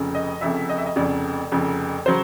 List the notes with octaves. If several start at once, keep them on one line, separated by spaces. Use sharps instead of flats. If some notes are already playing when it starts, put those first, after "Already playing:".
Already playing: F1 F2 C#3
D#5
F1 F2 C#3 E5
D#5
E5
D#5
F1 F2 C#3 D5
F1 F2 C#3
C#3 F#3 C5